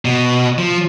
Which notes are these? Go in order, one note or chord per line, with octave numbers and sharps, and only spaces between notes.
B2
F3